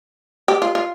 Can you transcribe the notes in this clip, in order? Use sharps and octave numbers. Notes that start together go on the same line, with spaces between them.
G4
F4
F4